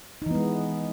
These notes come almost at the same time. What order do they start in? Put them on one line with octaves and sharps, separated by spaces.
D#4 E3 B3 G#3